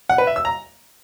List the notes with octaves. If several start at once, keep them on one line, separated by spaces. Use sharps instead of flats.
F#5
B4
E5
E6
A#5